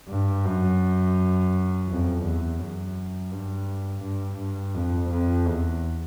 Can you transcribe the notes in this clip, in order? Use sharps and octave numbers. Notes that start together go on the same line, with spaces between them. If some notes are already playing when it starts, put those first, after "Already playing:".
G2
F#2
F2
E2
F#2
G2
G2
G2
F2
F2
E2